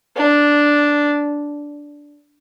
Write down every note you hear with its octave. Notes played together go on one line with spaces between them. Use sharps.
D4